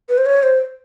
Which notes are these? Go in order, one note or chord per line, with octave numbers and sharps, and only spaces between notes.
B4
C5
C#5
C5